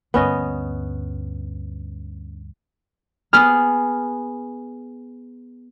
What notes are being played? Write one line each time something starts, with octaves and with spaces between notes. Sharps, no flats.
D2 G2 B3 C#4 D#5
B3 G#4 F6